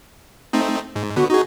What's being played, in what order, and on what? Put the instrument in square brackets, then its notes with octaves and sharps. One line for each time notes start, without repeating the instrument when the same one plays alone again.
[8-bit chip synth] A3 C4 D#4
G#2
[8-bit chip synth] D3 B3 [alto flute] F#4
[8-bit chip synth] D#4 G#4 [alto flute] F#4